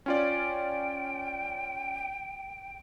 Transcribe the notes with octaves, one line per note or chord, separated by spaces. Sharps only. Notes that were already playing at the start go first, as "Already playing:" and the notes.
C#4 F4 D5 G5